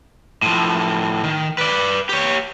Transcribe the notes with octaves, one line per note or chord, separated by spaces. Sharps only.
A2 F3
D#3
B4 D5
G4 C#5